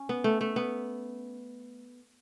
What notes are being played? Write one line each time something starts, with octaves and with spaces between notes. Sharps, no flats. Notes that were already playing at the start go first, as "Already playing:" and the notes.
Already playing: C#4
B3
A3
A3
B3